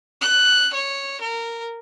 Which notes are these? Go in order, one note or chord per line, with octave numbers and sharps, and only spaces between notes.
F#6
C#5
A#4